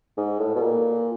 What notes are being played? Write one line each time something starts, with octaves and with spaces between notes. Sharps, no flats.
G#2
A2
B2
A#2